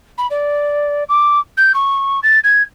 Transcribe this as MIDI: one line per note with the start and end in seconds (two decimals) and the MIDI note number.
0.18 0.27 83
0.30 1.04 74
1.09 1.39 86
1.57 1.72 91
1.74 2.20 85
2.23 2.39 93
2.44 2.62 92